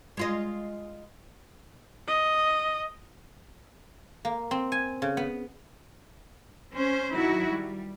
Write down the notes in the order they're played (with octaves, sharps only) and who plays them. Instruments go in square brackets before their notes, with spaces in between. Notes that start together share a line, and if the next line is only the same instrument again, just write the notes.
[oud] G#3 F4 D#5
[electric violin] D#5
[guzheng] A#3
C4
G#5
C#3
B3
[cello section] C#4 C5
D#3 F#3 E4 F#4
G3